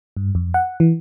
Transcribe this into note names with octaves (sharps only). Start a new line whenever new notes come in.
G2
F2
F#5
E3